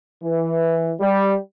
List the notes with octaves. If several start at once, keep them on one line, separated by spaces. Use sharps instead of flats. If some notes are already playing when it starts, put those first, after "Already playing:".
E3
G3